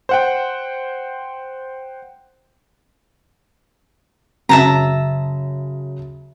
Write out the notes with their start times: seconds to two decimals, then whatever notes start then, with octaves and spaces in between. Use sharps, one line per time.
0.09 C5 F#5 G5
4.49 F#2 C#3 E5 A5 A#5